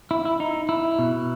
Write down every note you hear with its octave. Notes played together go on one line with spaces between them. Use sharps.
E4
E4
D#4
E4
B2